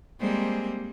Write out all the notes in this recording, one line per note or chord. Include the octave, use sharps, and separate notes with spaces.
G3 G#3 A#3 C4 G#4 C5